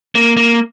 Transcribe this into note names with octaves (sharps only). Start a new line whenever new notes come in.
A#3
A#3